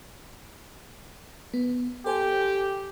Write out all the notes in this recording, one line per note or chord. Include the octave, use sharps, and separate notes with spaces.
B3
G4 A4 C5 G#5